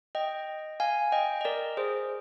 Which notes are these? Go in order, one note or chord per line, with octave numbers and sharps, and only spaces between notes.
D#5 G5
F5 G#5
D#5 G5
D#5
A#4 D5
G#4 C5